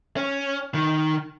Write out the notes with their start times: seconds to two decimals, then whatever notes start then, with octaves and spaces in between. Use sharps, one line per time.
0.17 C#4
0.74 D#3